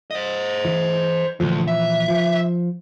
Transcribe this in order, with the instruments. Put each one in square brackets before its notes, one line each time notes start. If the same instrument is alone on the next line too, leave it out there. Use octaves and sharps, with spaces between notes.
[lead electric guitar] C5 D#5
[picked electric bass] E3
[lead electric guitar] D2 [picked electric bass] A#2 E3 F3
[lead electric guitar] E5
[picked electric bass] F3